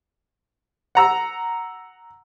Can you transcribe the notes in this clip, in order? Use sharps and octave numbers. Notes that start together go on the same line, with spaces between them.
F#5 A#5 E6